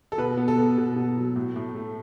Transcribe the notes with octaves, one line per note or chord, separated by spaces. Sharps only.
A4
B2 B4
B3
A4
B3
B2
B2
F#3
A2
A2
A3